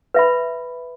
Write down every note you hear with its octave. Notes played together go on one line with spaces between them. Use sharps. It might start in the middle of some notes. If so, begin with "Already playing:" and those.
B4 E5 B5